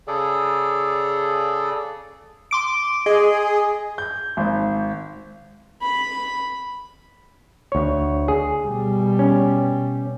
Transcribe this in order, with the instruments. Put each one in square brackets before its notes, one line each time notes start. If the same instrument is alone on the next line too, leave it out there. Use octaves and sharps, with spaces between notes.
[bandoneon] C#3 G#4 A4 D5
[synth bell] C6 D6 D7
[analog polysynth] G#4 [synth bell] D#5
[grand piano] G6
G#1
[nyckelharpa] B5
[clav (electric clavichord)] D2 C#5
G#4
[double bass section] B2 G3
[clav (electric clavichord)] C#4